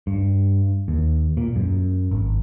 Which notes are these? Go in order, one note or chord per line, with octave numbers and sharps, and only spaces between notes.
G2
D#2
A#2
F#2
G#1